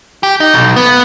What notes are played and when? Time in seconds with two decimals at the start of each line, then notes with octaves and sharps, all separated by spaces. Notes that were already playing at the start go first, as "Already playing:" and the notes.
0.23 G4
0.40 D#4
0.54 B1
0.76 B3